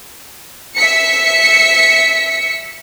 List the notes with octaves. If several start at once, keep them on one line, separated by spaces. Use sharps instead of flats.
E5 B6 C#7